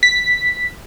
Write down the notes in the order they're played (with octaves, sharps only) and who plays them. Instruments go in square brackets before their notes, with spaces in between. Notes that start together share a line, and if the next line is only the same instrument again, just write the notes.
[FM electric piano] B6